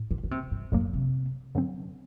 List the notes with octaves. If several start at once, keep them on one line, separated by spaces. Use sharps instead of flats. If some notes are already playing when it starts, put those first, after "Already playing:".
Already playing: A2
D3
D3
C3
G2
F#2 A2 F#3 A#3
C3
G2 D3 F#3 C4